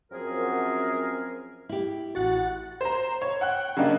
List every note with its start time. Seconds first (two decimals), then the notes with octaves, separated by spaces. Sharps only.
0.12 F#2 F3 C4 G#4 A#4
1.69 E4 G4
2.15 A1 F#4 F#5 A6
2.81 C5 A#5
3.22 C#5
3.41 F#5 G5 F#6
3.77 C#3 F#3 A#3 D4 D#4